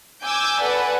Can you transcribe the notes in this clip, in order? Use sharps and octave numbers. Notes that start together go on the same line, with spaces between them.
G#5 D6 E6 G6
A4 B4 D5 F#5 G#5